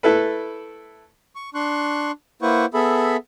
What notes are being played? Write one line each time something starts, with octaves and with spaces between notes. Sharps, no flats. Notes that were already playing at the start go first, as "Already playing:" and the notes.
A3 E4 A4 B4
C#6
D4 C6 C#6 F#6
A#3 E4 B4 C5 F#5 C#6
B3 G#4 A4 E5 B5